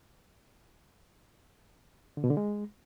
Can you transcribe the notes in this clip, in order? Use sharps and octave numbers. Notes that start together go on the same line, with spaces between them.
D3
B2
D3
G#3